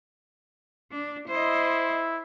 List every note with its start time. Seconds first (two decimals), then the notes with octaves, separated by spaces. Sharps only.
0.92 D4
1.28 E4 C5 D#5